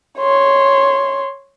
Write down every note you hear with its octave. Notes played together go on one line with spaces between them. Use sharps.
C#5 C6